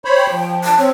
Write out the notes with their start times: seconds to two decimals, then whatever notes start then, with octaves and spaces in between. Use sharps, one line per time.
0.05 C5 C#5 B5
0.17 G5
0.31 F3
0.64 A5
0.78 C4 C#5